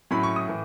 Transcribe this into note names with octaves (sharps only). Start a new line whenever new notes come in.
A2 F#3 C#4 E4 B5
C#6
D#6
A2 E3